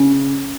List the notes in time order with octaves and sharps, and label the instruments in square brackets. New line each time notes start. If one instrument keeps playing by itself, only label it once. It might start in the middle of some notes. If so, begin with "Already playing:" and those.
Already playing: [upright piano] C#3